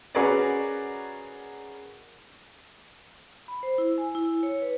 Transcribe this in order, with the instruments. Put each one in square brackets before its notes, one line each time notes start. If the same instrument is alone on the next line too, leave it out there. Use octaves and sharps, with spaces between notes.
[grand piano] C#4 F#4 G#4 A#4 B4 D5
[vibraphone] B5
C5
E4
G#5
E4
C#5
B4